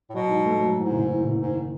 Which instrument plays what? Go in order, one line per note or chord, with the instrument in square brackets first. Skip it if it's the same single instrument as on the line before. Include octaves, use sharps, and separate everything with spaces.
[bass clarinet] A2
[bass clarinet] B2 [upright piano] F#3
[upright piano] G#2
A3
F#3
[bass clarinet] G#2 [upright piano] E3
[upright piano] F#1
E3
F#1
[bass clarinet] G#2 [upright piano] D#3
[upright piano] D#3